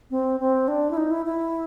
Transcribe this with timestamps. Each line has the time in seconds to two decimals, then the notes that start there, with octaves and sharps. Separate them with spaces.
0.11 C4
0.40 C4
0.68 D4
0.91 E4
0.97 D#4
1.11 E4
1.26 E4